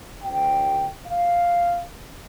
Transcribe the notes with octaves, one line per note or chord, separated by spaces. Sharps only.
D2 G5
F5